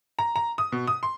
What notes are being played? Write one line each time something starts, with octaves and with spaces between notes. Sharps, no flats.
A#5
A#5
D#6
B2
D#6
C6